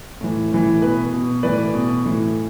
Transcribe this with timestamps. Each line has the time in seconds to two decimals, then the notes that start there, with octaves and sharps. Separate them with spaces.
0.21 A2 E3
0.51 A2 E3
0.82 B2 B4
1.13 B2
1.43 A2 E3 B4 D5
1.74 B2
2.06 A2 E3